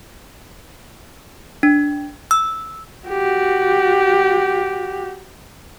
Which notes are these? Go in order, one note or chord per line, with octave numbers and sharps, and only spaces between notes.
D4
E6
F#4 G4